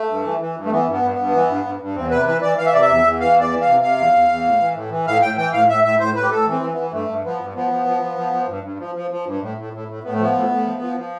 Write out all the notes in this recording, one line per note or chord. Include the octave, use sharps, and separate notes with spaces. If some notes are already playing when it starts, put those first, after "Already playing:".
Already playing: A3
G2
E3
E3
G2
A3
E3 B3
G2
B3
G2
G2 B3
E3
G2
G2
G2
E2 C4
C3 B4
E3 B4
E3 D5
E3 F5
E5
C3 D5
E5
E2
E2
E3 F5
E2 D5
E3
C3 F5
C3 F5
E2
E2
E2
A2
E3
A2
E3
A2 F5
A2 G5
E3 G5
A2 F5
A2 E5
A2 E5
A2 C5
A2 B4
G4
A2 A4
E3
C4
E3
B3
E3
G2 A3
G2
F3 B3
G2
F3 B3
F3
F3
F3
F3
F3
G2
G2
F3
F3
F3
G2
A2
A2
A2
A2
A2 B3
A3
F3 B3
A2
A2
F3
F3
F3